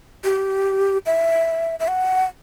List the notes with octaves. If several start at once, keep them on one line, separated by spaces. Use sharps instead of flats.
G4
E5
E5
F#5